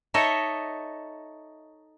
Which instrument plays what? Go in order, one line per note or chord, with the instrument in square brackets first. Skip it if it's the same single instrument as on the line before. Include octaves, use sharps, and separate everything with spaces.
[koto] D#4 A4 C#5 D#5 E5